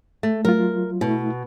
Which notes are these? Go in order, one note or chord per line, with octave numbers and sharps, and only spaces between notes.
A3
F#3 F4 A#4
B2 A3 E4